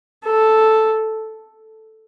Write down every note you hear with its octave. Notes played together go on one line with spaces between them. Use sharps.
A4